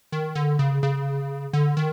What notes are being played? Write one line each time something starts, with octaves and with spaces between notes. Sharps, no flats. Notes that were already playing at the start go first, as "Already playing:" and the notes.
D#3
D3
C#3
C#3
D3
D#3